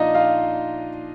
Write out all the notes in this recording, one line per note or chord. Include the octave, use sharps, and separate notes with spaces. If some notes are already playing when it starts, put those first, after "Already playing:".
Already playing: A#2 F3 D4 D#4 F4 D#5 F5
F4 F5